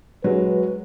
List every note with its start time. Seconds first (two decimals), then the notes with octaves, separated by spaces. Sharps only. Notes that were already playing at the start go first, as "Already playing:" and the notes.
0.24 F#3 G#3 B4